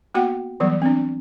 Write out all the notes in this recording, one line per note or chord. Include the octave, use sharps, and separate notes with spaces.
A#3 B3 F#4 F#5 G5
E3 F#3 G3 B3
C4 D4